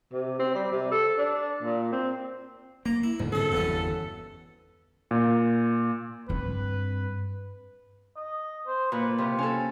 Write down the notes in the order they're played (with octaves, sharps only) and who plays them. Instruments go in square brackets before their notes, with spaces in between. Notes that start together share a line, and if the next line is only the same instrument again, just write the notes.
[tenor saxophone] C3
C4
G3
C3
A4
D4
A#2
C4
[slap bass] A#3 [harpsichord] A#5
[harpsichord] E4
[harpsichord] B1 [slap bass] G#2 D3 D#3
[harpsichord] C2 F#2 G#4 [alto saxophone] A4
[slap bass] G1 E2 [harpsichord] B2 E3 C#4
[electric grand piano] A#2
[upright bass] G2 C4 [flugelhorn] B4
[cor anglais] D#5
C5
[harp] A#2 [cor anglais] B4
[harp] C3 [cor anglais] F4
[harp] C#4 A4